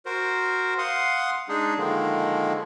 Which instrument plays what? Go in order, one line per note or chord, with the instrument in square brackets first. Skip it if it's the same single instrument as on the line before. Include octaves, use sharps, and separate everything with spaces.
[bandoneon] F#4 A#4 C5
F5 F#5 C6 D#6
G#3 D4 D#4 G#4
D3 D#3 F3 G#3 A#3